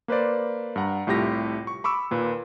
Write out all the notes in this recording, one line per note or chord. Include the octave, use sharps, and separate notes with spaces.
A#3 B4 C5 D5
G2 F#5 A#5
C2 A2 F4 G4 A#6
C#6
B5 C#6 D6 E6
D#2 A#2 B4